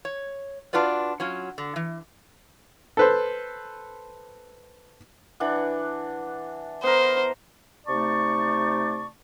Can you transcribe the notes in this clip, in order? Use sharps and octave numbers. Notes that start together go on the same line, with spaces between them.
C#5
D4 F4 F#4 B4 D5
F#3 C#4 F4
D3
E3
A4 B4 C5
E3 D4 F#5
B3 A#4 C5
C3 A3 D#4 D5 A5 C#6